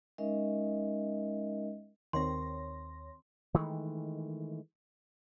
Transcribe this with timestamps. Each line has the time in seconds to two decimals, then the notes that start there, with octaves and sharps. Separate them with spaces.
0.18 G#3 C#4 D#4 A#4 D#5 E5
2.13 D#2 D#3 C4 C#5 C6 A#6
3.54 D#3 E3 G#3 A3